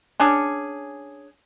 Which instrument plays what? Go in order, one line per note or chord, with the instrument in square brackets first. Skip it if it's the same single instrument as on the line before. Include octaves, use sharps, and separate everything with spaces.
[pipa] C#4 D4 G#4